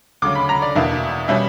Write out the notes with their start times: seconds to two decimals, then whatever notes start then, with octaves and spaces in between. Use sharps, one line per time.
0.22 D2 C#3 F#3 D6
0.35 B5
0.49 A#5
0.62 D5
0.75 E2 B2 A#3 D4 E5
1.28 B2 G3 C#4 E5